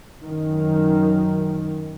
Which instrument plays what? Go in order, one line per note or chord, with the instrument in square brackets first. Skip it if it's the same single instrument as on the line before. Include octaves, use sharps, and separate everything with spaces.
[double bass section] F#2 D#3